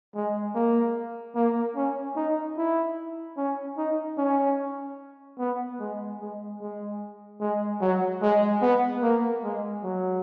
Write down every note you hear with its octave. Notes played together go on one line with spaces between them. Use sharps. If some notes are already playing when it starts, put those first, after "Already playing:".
G#3
A#3
A#3
C#4
D#4
E4
C#4
D#4
C#4
B3
G#3
G#3
G#3
G#3
F#3
G#3
B3
A#3
G#3
F#3